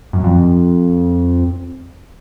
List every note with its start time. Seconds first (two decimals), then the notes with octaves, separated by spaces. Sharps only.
0.13 F#2
0.24 F2